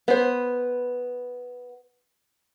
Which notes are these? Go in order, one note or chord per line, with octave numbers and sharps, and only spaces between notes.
B3 C5